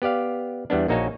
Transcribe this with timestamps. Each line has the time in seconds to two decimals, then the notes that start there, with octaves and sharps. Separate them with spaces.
0.02 B3 G4 D5 F5
0.70 E2 G3 B3 D4
0.88 A#1 A#3 D#4 F#4 C#5 G#5